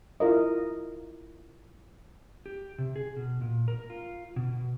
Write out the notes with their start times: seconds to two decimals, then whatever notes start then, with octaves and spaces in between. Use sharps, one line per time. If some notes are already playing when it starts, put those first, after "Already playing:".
0.20 E4 F4 A#4 D#5
2.46 G4
2.78 C3
2.96 G#4
3.17 B2
3.41 A#2
3.68 A#4
3.90 F4
4.36 B2
4.51 B2